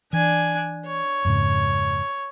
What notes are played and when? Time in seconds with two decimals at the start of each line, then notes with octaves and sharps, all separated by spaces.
0.13 E3 D4 G#5
0.86 C#5
1.25 F2 G#2 C#3